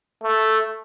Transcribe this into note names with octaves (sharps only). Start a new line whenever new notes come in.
A3